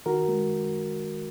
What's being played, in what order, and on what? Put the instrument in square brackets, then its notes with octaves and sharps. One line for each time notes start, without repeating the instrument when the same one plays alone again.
[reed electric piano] D#3 F#4 A#4
G#3